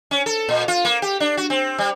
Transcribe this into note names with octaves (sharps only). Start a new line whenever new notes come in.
C#4
A4
A#2
F4
A#3
G4
D4
F#4
C4
G3